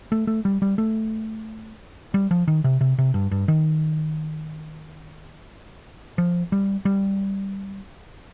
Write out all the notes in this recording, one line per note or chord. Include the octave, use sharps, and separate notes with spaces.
A3
A3
G3
G3
A3
G3
F3
D#3
C3
C3
C3
G2
G2
D#3
F3
G3
G3